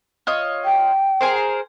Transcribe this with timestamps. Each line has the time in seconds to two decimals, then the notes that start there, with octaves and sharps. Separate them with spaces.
0.27 F4 C#5 D#5
0.65 G5
1.21 G#4 A#4 C5